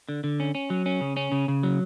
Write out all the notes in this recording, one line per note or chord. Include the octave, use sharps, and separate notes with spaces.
D3
D3
C#4
C#4
F#3
C#4
C#3
C#4
C#3
C#3
F#3